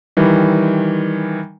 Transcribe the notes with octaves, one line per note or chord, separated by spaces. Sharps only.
D#3 E3 G3